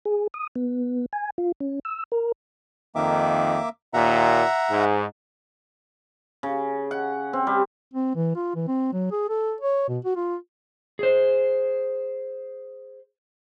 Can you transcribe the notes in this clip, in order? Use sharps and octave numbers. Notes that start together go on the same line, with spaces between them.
G#4
D#6
B3
G#5
F4
C#4
E6
A#4
F2 D#3 A#3 E5 D6
D#2 A#2 E5 F#5 A#5
G#2
C#3
F#5
C4
G3
C4
E3
F4
E3
C4
F#3
G#4
A4
C#5
B2
F#4
F4
G#4 C5